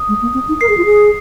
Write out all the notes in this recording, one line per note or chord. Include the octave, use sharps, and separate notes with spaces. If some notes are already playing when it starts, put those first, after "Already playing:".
Already playing: D#6
G#3
A#3
C4
D#4
A#4 C7
G#4
F4
G#4